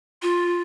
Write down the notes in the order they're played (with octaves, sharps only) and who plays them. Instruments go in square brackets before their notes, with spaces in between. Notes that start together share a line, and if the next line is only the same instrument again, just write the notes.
[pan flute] F4